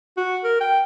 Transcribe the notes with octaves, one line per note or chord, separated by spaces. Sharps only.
F#4
A#4
G5